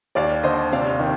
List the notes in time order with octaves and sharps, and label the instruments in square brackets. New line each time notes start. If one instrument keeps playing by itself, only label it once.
[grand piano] D#2 [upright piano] D5 F5
[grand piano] D3 [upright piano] C5 D#5
[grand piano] C3 [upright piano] D5 F5
[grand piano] D#3